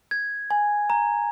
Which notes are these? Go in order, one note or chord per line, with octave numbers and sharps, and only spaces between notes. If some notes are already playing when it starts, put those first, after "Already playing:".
G#6
G#5
A#5